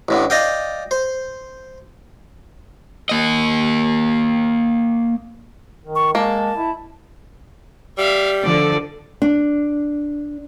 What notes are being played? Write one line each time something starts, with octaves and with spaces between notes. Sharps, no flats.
A1 A2 D3
D5 D#5 F5 G5
C5
A#3 D#5
D#3
C#6
G#3 A#3 A5
E4
G3 E5 F5
D3 F3 A4 D5
D4